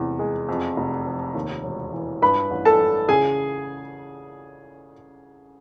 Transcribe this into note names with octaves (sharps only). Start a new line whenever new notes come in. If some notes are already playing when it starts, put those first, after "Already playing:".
Already playing: F1 E2 C3
G#3
F2
F1
F3
D#2
E1
E3
G2 B4 B5
A1
A4 A5
A1
C#3 G#4 G#5